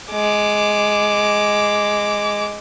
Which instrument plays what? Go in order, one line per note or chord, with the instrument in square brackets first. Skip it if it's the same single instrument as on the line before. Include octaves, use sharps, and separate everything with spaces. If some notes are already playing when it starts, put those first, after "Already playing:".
[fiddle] G#3 D6